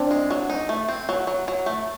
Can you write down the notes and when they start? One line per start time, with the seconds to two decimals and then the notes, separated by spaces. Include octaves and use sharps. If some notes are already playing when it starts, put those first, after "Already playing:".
Already playing: C4 D4
0.11 G#3
0.30 F#3
0.50 D#4
0.69 A3
0.89 C4
1.09 F#3
1.27 F#3
1.48 F#3
1.66 A3